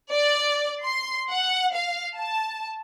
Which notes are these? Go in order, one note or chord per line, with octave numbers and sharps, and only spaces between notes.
D5
C6
F#5
F5
A5